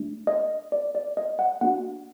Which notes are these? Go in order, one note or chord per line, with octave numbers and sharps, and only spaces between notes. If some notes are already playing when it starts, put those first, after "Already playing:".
Already playing: A3 D4
D#5
D5
D5
D#5
F#5
A#3 D4 F#4 F#5